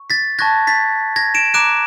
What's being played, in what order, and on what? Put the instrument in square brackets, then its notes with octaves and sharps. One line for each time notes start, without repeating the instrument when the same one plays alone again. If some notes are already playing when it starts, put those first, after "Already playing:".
Already playing: [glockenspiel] C#6
A6 B6
A5 C#6 F#6 G#6 A#6
A6 B6
G#6 A#6
D7 E7
A#5 D6 F#6 D7 E7